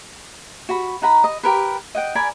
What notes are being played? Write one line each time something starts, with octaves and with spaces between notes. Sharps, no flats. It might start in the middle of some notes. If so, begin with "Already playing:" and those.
F#4 B5
D#4 F#5 A#5 B5
D#5
G4 A#4 B4
D#5 F#5 G5
A#4 D5 G#5 B5